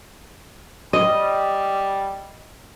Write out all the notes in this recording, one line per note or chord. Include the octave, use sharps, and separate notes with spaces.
G3 D#5